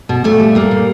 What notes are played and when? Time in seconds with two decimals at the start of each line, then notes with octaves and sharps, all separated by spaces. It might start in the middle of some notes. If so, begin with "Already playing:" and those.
0.09 B2
0.24 A#2 A3
0.40 G3
0.55 G3 A#3
0.71 A#2